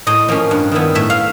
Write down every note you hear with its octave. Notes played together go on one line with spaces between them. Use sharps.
A2 D#5
F3 A#3 C#4
G2
D#3 G3 B3 E4
A2 E5
F5